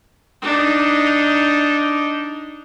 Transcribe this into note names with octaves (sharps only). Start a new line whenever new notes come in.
D4 D#4